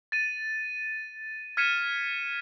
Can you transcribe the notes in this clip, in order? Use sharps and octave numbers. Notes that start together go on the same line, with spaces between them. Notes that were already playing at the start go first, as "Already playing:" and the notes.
A6 D#7
F6 G#6 B6 C#7 D#7 E7